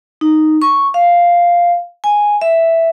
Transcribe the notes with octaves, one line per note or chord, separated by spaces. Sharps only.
D#4
C#6
F5
G#5
E5